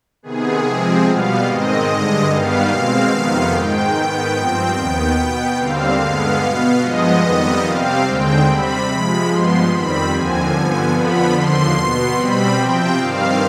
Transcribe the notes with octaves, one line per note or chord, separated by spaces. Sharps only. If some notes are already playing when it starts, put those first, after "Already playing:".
C3 D#3 B3 G#4
C3 F3 G#3 C4
B2 G3 B3 F5
G#2 D#3 G#3 C4 D#5
G2 D3 G#3 D#5
G2 D#3 G3 B3 F5
B2 G#3 C4 F5
F2 C3 D#3 B3
G#2 D#3 G#3 G5
G#2 D#3 B3 G5
G2 F3 C4
D#2 D#3 B3
B2 B3
D#2 D3 G3 C4 F5
G2 D3 G#3 B3 F5
B2 B3
G2 F3 G#3 B3 D#5
F2 D#3 G3 B3
C3 G3 C4 F5
D#2 D3 G#3 C4 G5
C3 G3 C4 B5
C3 F3 G#3 B5
G2 F3 G#3 B3 C6
F2 D#3 G3 C4 B5
D#2 D3 F3 C4 G#5
G2 D3 F3 B3
F2 D3 F3 B3 B5
D#2 D3 F3 C6
B2 B3
B2 G3 C4 B5
C3 F3 C4 G5
G2 D#3 G3 C4 F5